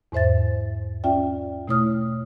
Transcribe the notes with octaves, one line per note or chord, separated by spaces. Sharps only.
E2 G#2 C5 E5 A6
C#4 F4 D5 E5 G5
B2 A3 E4 C#5 D#6 F6